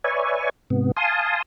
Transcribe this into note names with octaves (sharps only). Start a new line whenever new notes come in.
B4 C#5 D5 E5 G#5 C#6
G#2 C3 B3
F5 G#5 A5 C6 D#6